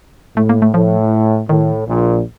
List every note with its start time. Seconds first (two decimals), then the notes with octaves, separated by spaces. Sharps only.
0.37 A2 A3
0.49 A#3
0.62 A3
0.74 A2 F3
1.49 A2 D#3
1.87 A#1 A#2